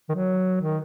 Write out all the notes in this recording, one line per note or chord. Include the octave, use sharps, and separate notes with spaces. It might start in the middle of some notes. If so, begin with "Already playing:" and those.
D#3
F#3
D#3